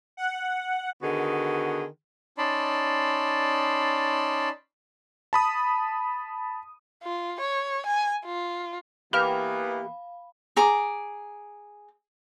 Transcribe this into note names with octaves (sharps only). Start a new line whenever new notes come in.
F#5
D3 D#3 B3 F#4 G#4
C#4 D#4 D5 A5 B5 C6
A5 B5 D#6
F4
C#5
G#5
F4
E3 A#3 B3 G4 F5 B5 F6
G#4 A#5 D6